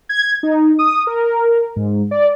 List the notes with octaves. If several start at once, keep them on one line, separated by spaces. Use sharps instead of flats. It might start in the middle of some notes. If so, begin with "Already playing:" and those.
G#6
D#4
D#6
A#4
G#2
D5